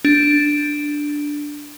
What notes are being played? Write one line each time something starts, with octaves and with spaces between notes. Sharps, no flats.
D4